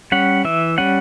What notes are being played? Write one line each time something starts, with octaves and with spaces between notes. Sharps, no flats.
G3 C#4 F#5
E3 E5
G3 C#4 F#5